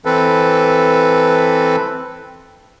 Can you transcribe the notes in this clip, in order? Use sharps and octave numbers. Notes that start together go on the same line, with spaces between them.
E3 C4 A4 B4